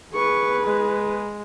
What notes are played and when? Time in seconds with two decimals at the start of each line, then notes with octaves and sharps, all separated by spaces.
0.14 G#4 B4 C#6
0.66 G#3